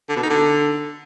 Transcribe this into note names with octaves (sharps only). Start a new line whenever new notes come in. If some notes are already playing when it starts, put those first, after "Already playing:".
D3
B2
D#4
D3